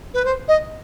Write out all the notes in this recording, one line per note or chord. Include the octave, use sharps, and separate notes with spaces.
B4
C5
D#5